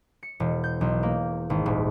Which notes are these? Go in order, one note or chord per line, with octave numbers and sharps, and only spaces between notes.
C#7
E1
G6
B1
A#3
G#1
D#1